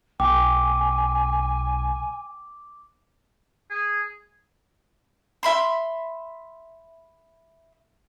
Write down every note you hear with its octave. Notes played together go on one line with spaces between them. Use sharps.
B1 G5 G#5 D6
G#4
E5 B5 C6